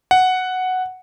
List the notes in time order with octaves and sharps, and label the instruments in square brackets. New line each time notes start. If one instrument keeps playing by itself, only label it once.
[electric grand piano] F#5